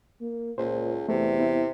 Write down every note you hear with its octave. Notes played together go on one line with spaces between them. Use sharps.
A#3
C#2 A#2 C5
E2 C3 A3 A4
B3 E4